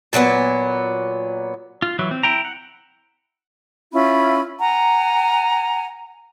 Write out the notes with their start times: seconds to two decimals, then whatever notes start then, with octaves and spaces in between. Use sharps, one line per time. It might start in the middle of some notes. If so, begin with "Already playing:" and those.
0.13 A#2 F#3 A#3 B3
1.82 F4
1.99 E3 F#3 E4
2.11 C4
2.23 E4 G5 A#5
2.45 F#5
3.92 C#4 E4 F4 B5
4.60 F#5 G#5 A#5